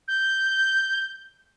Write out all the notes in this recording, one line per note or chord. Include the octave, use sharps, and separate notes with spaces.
G6